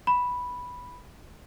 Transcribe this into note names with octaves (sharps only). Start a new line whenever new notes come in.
B5